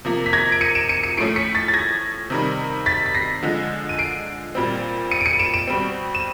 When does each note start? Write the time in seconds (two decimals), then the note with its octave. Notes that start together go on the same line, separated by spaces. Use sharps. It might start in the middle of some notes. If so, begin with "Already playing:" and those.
0.05 C3 F3 A#3
0.26 B6
0.33 G#6 A#6
0.52 D7
0.61 C#7 D#7
0.75 D7 E7
0.89 C#7 D#7
1.03 C#7 D#7
1.17 A2 F3 A3 C#4 C7 D7
1.36 B6 C#7
1.55 A6 B6
1.68 A6
1.74 G#6 A#6
2.30 C3 D#3 G3
2.86 A6 B6
3.06 B6
3.15 A#6 C7
3.43 D3 F3 G#3
3.89 D#7
3.99 C7 D7
4.55 A#2 G3 C4
5.11 C#7 D#7
5.21 D7
5.25 C#7 D#7
5.39 D7 E7
5.54 D7 E7
5.67 B2 G3 C4
6.15 E7